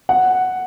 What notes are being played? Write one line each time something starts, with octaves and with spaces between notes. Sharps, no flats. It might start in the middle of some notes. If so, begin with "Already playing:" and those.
F#5